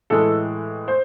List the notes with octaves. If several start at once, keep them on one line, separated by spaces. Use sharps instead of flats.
A2 E3 G#3 A4
C5